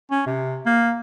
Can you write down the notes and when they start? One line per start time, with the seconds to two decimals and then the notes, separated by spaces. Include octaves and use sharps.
0.11 C#4
0.26 C3
0.66 A#3